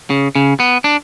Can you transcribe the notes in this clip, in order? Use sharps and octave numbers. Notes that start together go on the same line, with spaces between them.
C#3
C#3
B3
D4